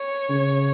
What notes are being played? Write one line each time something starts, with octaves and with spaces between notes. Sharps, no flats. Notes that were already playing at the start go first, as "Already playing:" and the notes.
Already playing: C#5
C#3